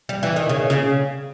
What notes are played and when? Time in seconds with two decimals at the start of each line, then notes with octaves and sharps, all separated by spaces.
0.09 G3
0.23 E3
0.36 D#3
0.49 C#3
0.70 C#3